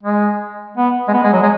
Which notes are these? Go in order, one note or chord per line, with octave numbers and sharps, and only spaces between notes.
G#3
B3
G#3
B3
G#3
F#3
G#3